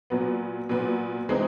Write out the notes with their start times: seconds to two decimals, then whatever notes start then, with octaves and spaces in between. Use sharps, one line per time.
0.10 A#2 F#3 B3
0.69 A#2 F#3 B3
1.29 E3 G#3 C4 D#4